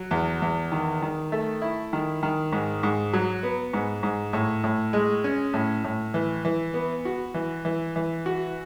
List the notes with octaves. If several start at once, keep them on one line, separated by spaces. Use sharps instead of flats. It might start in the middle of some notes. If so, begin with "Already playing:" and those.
Already playing: F#3
E2
E2
D#3
D#3
A3
E4
D#3
D#3
G#2
G#2
F#3
B3
G#2
G#2
A2
A2
G#3
C#4
A2
A2
E3
E3
B3
F#4
E3
E3
E3
F#4